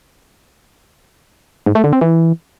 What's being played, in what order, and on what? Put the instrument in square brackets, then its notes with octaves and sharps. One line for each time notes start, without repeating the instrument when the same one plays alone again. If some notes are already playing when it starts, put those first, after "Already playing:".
[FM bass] G#2
A3
D3
C4
E3